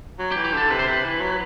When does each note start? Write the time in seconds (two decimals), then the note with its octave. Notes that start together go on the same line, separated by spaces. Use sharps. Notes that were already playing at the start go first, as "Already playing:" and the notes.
0.19 F#3
0.32 G4
0.36 E3
0.44 G4
0.52 D3 A4
0.70 C3 B4
0.79 C5
0.87 C3 B4
1.04 E3
1.21 F#3